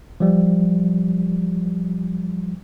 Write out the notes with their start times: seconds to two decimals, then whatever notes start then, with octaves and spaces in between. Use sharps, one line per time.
0.20 F3 G3